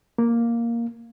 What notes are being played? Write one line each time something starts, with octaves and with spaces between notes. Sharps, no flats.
A#3